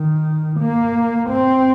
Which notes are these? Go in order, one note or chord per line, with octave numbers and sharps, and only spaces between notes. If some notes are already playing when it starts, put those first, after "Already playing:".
Already playing: D#3
A#3
C4